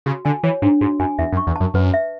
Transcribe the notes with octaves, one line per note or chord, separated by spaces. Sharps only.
C#3 F#4
D3 G#5
E3 C#5
G#2 D4
G#2 F#4
F#2 G#5
E2 E5
F#2
C#6
E2
F#2 A5
F#2 B4
E5